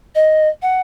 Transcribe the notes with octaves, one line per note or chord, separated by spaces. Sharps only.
D#5
F#5